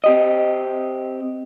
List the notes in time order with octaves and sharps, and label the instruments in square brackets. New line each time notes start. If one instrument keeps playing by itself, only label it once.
[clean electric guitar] C4 G4 D#5